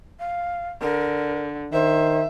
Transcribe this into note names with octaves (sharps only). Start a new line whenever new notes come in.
F5
D3 A#4
D#3 C5 E5